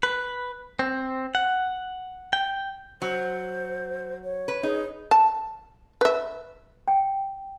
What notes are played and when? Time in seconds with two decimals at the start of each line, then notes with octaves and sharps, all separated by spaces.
0.03 B4
0.79 C4
1.35 F#5
2.33 G5
3.02 F#3 C5
4.24 C#5
4.48 B4
4.63 D#4 G#4
5.11 A5
6.01 B4 E5
6.88 G5